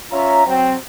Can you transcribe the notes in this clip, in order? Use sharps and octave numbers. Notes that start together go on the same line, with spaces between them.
C#4 F4 C#5 E5 A#5
F#3 C4